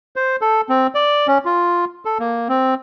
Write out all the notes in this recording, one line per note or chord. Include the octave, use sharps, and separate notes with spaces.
C5
A4
C4
D5
C#4
F4
A4
A#3
C4